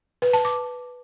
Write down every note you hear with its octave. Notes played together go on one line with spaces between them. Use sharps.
B4
A5
D6